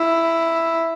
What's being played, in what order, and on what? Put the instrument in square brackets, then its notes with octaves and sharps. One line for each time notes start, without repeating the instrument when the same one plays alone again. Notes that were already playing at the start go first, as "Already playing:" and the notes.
Already playing: [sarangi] E4